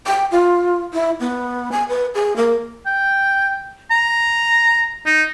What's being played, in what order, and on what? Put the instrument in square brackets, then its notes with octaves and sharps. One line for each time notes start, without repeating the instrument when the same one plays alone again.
[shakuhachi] G5
F4
E4
B3
G#5
B4
G#4
A#3
[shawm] G5
A#5
D#4